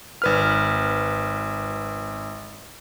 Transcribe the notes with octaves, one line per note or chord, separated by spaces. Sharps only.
G#1 B4 F6